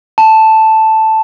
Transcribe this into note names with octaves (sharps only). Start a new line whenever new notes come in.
A5